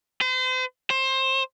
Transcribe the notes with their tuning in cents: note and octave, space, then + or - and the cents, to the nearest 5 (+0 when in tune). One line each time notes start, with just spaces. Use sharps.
C5 -40
C5 +20